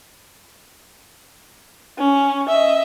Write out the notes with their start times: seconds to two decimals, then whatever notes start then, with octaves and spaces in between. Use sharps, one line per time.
1.98 C#4
2.49 D#5 E5